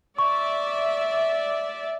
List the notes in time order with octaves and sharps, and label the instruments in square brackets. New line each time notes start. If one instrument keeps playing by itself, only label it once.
[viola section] D5 E5 [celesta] C#6